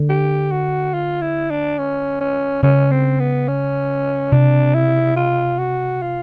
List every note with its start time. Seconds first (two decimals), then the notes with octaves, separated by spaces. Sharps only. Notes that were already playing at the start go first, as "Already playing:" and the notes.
Already playing: D3
0.09 G4
0.51 F#4
0.94 F4
1.21 E4
1.50 D4
1.78 C#4
2.21 C#4
2.63 C#3 C#4
2.91 C4
3.20 B3
3.48 C#4
4.32 C3 D4
4.75 E4
5.17 F4
5.59 F#4
6.02 F4